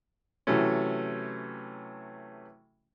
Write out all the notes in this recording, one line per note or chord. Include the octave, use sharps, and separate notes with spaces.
C3 E3 F#3 A3 C#4